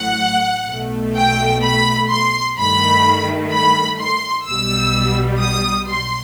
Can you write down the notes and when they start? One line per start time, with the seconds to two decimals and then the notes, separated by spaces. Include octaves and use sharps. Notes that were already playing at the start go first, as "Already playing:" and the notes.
Already playing: A1 A2 F#3 F#5
0.68 B1 B2 A3
1.16 G5
1.63 B5
2.10 C6
2.57 G2 D#3 A3 B5
3.52 B5
3.99 C6
4.47 B1 B2 G3 E6
5.41 D#6
5.88 C6